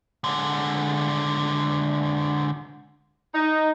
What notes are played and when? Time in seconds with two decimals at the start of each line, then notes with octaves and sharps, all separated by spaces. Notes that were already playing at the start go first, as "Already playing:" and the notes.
0.24 D3 G#3
3.34 D#4